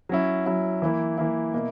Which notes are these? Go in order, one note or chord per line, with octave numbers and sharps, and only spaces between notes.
F#3 C#4 E4
F#3 C#4 E4
E3 A#3 E4
E3 A#3 E4
B2 A#3 E4